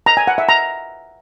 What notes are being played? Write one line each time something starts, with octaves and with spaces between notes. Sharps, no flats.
A#5
G#5
F#5
E5
A#5